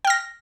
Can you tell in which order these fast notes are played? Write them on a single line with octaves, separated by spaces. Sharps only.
G5 F6 A#6